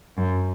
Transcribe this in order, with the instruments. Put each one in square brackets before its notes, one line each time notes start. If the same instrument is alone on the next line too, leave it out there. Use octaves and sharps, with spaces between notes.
[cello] F#2